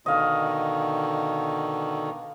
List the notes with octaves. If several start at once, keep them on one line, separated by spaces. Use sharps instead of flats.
B2 D3 D#3 D#5 F5